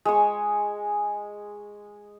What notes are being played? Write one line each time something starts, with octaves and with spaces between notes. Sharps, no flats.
G#3 C#6